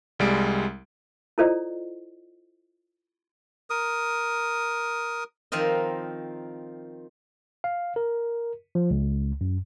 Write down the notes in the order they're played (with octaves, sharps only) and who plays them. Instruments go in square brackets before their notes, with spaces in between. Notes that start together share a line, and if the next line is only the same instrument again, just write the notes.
[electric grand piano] C2 G3 G#3 D7
[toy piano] E4 F4 A4 C5 D5 D#5
[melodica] A#4 D#6
[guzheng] D#3 F3 C4 A#4 D#5
[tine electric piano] F5
A#4
F3
C#2
F#2